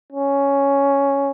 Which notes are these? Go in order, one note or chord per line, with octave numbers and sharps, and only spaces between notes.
C#4